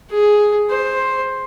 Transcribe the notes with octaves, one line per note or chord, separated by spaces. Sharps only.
G#4
C5